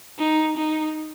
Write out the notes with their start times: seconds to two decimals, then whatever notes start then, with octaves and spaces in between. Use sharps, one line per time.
0.19 D#4
0.57 D#4